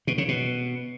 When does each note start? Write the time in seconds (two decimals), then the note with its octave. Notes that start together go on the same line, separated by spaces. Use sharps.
0.07 B2
0.18 C#3
0.28 B2